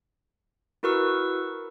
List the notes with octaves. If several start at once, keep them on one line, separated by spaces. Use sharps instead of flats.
E4 F#4 A#4 B4 C#6 E6